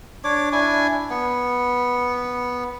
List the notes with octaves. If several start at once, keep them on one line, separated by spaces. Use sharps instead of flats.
D4 C#5 D6
D4 E4 G#5
B3